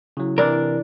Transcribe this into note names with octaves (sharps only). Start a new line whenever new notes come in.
C#3 F#3 E4
C3 E3 D4 A#4 D5